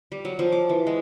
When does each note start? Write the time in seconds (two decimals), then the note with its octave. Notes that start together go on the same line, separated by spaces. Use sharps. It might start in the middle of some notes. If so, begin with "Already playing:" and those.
0.12 G3
0.25 F#3
0.39 F3
0.52 D6
0.69 E3
0.87 G#3